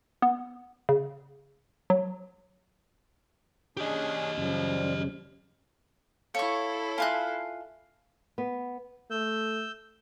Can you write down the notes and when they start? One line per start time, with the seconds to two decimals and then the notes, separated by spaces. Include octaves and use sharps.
0.22 B3
0.89 C#3
1.90 F#3
3.77 C#4 D4 G4 G#4 D#5
4.38 F#2 C#3 F3 G3
6.35 E4 A4 C#5 F5 C#6
6.98 F4 E5 F5 G#5 A5 F#6
8.38 B3
9.11 A3 E6 G6